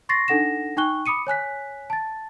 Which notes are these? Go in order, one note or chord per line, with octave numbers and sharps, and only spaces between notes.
C6 C#6 A6 A#6 C7
D4 D#4 A4 F#5 A#6 E7
D#4 G5 C#6 F#6 G7
B5 D6 D#6 C#7 D#7
C#5 G#5 F#6 B6
A5 A6